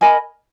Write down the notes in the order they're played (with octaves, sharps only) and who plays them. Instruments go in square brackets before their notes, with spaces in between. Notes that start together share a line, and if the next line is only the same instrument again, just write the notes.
[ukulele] A#4 D#5 G#5 B5